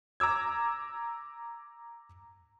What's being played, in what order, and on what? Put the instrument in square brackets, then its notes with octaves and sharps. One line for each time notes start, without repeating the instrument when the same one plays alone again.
[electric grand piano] A#5 D6 E6 G#6